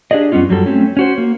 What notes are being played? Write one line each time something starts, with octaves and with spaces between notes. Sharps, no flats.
D4 G4 G#4 D5 D#5
F#2 G3 B3 C#4 F4
F#2 F#3 G3 A4
A3 C4 C#4
C#4 F#4 C5
A#3